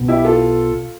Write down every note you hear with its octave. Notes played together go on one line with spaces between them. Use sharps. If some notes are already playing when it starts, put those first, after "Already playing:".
Already playing: B1 B2 B3
E4 G4
F4 A4